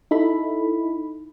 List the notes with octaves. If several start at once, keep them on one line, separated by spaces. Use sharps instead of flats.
D#4 E4 A4 B5